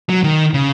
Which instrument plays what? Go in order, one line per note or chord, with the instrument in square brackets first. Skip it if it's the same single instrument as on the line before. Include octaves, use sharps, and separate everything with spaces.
[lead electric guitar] F#3
D#3
C#3